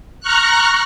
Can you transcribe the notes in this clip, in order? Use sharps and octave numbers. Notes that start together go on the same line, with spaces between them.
A#5 C#6 F6 F#6